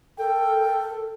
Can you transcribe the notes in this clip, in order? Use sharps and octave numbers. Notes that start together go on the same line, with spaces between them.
A4 A#4 G5